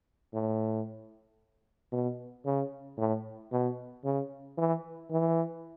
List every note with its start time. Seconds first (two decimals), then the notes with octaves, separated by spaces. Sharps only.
0.33 A2
1.92 B2
2.45 C#3
2.98 A2
3.52 B2
4.05 C#3
4.58 E3
5.11 E3